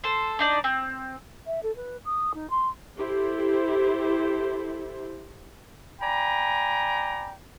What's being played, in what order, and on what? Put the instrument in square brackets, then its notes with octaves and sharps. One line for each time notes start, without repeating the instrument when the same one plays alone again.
[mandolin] A4 C5
D4 D#4 D5
C4
[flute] E5
A4
B4
D#6
D#4
C6
[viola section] E4 G4 A4 C5
[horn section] D5 G5 G#5 A#5 B5